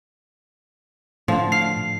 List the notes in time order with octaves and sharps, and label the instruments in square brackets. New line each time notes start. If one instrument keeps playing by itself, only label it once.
[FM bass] A2 [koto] D3 F3
[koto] F5 [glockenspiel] C7